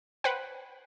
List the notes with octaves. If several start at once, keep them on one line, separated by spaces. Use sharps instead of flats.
B4 C5 F#5 G5